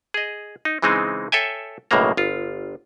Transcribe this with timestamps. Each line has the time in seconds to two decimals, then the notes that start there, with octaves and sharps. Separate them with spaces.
0.14 G#4 D#5
0.65 D#4
0.82 C#3 E3 G#3 C4 D#4
1.32 A4 C#5 E5 G5 G#5
1.91 B1 A2 C#3 G#3 A#3 A#5
2.17 G1 F4